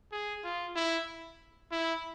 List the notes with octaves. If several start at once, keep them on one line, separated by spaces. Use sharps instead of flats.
G#4
F4
E4
E4